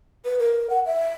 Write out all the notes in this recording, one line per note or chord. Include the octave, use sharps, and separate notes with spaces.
B4
A#4
F#5
E5